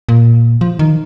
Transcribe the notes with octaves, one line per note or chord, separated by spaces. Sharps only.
A#2
F3
D#3